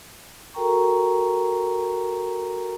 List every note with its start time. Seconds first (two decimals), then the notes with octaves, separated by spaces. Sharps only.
0.54 F#4 A4 A#4 G5 A#5 C#6